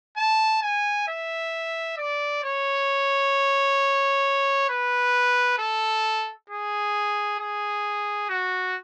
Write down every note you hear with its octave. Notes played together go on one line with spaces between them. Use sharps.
A5
G#5
E5
D5
C#5
B4
A4
G#4
G#4
F#4